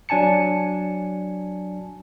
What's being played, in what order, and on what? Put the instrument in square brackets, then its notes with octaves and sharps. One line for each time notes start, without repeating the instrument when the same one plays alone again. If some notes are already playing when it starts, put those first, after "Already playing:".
[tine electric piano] F#3 D4 G#5 A5 C#7